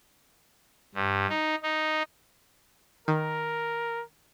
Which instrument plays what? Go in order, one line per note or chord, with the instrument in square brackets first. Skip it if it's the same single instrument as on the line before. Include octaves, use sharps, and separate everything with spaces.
[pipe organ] G2
D#4
D#4
[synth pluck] D#3 [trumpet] A#4